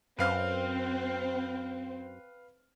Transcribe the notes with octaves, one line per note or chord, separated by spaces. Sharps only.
F#2 C4 B4 F5 F6